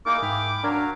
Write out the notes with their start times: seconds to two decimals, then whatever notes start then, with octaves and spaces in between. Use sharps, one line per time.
0.06 A#3 D#4 E4 G#4 A#4 D6
0.22 G#2 G5 B5 F6
0.64 F#3 D4 F#4 A#4 F5 G#6